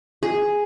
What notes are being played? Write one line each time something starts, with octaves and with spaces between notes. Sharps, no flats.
G#4